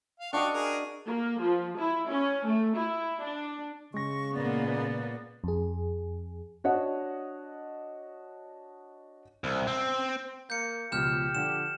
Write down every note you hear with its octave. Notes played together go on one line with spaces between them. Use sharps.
F5
D4 F#4 D#5 F5 G5 C#6
G#4 A#4
A#3
F3
E4
C#4
A3
E4
D4
C#3 G#3 C#6 A#6
A#2 A#3 B3 D5
F2 G#4
D4 F#4 C#5 D#5 F#5
C2
C4
A#3 G6 C#7
C#2 B2 F3 G4 F6 G6 E7
D3 F3 D4 E7